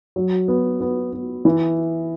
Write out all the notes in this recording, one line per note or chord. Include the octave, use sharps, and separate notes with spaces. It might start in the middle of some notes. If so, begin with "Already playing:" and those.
F#3
B3
B3
B3
E3